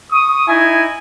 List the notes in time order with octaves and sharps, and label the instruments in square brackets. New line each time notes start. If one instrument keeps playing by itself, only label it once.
[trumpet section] C#6 D#6
D#4 E4 G#5